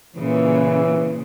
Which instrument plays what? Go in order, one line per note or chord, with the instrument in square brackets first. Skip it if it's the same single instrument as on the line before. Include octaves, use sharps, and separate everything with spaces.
[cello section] A#2 C#3 [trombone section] E3